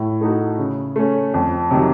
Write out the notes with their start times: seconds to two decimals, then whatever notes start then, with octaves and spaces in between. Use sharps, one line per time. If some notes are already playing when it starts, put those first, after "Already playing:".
Already playing: A2
0.21 A3 D#4 F#4
0.58 C#3
0.96 A3 C#4
1.34 F2
1.71 C3 D#3 F#3